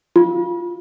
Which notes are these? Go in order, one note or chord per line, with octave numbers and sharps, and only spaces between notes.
F4